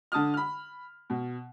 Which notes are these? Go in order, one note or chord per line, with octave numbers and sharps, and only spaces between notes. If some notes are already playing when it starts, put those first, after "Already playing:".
D3 A5 D#6 F6
B5 F6
B2